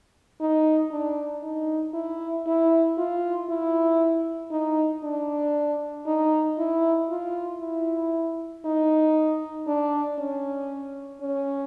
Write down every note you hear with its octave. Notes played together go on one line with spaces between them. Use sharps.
D#4
D4
D#4
E4
E4
F4
E4
D#4
D4
D#4
E4
F4
E4
D#4
D4
C#4
C#4